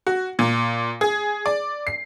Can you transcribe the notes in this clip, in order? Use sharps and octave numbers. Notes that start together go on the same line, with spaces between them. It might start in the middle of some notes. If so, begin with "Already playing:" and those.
F#4
A#2
G#4
D5
C7